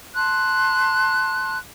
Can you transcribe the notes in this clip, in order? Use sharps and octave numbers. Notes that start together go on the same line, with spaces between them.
A5 C6 F#6